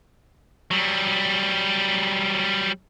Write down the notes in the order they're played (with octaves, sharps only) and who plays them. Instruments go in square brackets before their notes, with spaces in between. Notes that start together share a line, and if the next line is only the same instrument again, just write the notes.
[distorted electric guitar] F#3 G3